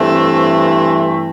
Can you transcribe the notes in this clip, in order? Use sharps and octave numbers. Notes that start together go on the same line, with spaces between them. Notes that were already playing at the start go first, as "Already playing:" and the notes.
Already playing: G2 E3 A3 C4